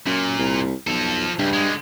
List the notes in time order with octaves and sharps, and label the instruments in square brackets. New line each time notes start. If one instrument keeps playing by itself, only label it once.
[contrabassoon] F#2 [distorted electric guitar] A#2
[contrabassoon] C2
[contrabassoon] B1 [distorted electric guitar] F3 A4
[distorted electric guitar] C#2 [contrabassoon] G2
[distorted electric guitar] D3 G#3